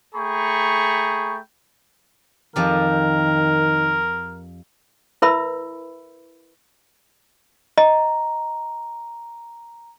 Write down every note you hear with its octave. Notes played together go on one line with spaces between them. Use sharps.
A3 G#4 G5 A#5 B5 C#6
F2 D#3 F3 G4 A#4
E4 A#4 B4 E5 B5 E6
D#5 A#5